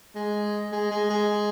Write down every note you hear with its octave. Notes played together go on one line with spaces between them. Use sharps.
G#3
G#3
G#3
G#3